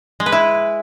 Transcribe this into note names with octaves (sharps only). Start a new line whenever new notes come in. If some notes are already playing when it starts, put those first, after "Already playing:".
G#3
B4
E4